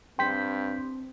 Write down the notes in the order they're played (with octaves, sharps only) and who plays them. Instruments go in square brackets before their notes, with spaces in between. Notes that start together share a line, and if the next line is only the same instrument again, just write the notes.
[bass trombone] G2 [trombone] C4 [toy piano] G5 [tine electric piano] C6 G6 B6